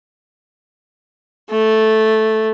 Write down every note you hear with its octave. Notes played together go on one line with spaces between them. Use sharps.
A3